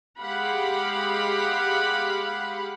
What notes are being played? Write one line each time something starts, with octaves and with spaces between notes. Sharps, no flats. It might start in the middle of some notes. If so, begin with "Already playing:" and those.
G#3 G4 F5 F#5 B5